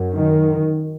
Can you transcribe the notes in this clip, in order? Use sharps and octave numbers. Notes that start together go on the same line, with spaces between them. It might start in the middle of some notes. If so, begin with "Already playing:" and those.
Already playing: F#2
D#3